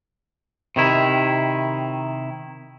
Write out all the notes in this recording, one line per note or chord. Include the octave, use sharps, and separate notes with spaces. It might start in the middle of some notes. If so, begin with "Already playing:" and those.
C3 D#3 E4